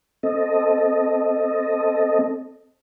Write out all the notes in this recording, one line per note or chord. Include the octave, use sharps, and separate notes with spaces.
C4 A4 D#5